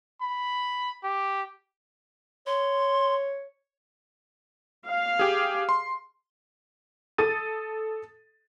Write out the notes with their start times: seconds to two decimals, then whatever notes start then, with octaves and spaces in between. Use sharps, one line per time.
0.21 B5
1.03 G4
2.47 C#5 C6
4.87 F5
5.19 G4 G#4
5.69 C6
7.18 A4 D#6 A6 D#7